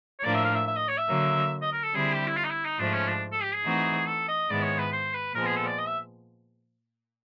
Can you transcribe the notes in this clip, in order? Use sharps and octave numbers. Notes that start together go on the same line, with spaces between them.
C#5
A2 F3 A#3 D4 D5
E5
F5
E5
E5
D#5
C#5
E5
D3 F#3 A#3
D#5
A#4
A4
D3 G3 C4 E4 G#4
G4
E4
F4
D#4
E4
D#4
G#2 F3 A3 D4
C#4
D4
A4
G4
G#4
E3 A3 C4 D#4 F#4
A4
D#5
G#2 D#3 G#3 B3 E4 D5
C#5
B4
C5
B4
A#2 F3 G#3 B3 A#4
G#4
A4
D5
D#5
E5